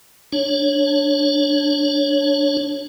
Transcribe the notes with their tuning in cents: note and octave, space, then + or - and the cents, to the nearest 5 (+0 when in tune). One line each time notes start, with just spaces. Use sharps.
D4 -5 C#5 -5